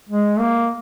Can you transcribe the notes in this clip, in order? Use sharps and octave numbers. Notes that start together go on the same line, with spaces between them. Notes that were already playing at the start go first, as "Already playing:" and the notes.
G#3
A#3